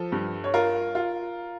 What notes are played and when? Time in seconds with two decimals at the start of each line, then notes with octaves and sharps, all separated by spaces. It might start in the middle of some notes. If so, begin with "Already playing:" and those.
Already playing: F3 A4
0.12 G2
0.44 C#5
0.54 F4 A#4
0.95 F4